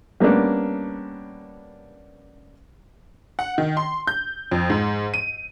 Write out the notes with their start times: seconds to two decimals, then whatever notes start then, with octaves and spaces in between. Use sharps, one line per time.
0.20 G3 A#3 B3 C#4 D4
3.39 F#5
3.58 D#3
3.77 C6
4.07 G6
4.51 F2
4.70 G#2
5.14 D#7